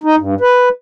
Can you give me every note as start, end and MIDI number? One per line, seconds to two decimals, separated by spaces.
0.04 0.15 63
0.18 0.34 43
0.41 0.69 71